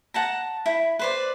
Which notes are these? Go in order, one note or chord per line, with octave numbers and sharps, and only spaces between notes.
F#5 A5 A#5
E4 B5
B4 C5 D5